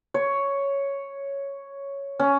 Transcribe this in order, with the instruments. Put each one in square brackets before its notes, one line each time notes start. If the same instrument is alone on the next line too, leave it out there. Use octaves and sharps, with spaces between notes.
[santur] C#5
C#4